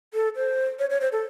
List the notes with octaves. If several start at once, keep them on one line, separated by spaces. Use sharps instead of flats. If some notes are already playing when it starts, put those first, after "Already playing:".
A4
C5
C#5
C#5
C5
A4